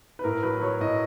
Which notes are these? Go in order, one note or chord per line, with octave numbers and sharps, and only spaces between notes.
B4
A2 A#4
F#3 B4
F#3 C#5
A2 D#5